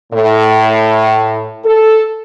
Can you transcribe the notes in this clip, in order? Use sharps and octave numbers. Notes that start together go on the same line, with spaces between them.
A2
A4